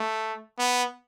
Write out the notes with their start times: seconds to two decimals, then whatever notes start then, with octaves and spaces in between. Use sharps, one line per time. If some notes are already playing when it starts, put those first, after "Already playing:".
Already playing: A3
0.59 B3